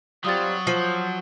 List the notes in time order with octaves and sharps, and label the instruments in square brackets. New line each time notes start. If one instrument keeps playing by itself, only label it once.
[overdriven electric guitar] F#3 [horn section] G3 C4 F4 [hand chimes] D#6 A6
[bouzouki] F3 [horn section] C5